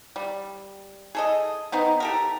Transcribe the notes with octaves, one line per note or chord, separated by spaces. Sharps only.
G3
G#4 A4 D#5
B3 C4 D#4
G4 A4 A#4